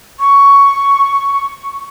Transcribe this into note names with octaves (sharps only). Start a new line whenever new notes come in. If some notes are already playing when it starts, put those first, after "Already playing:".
C#6